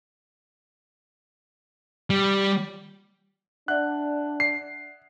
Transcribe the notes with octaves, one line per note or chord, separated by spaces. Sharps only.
G3
D4 D5 E5 F#5 F#6
C7